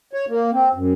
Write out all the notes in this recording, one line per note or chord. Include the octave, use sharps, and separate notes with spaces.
C#5
A#3
C4
F#2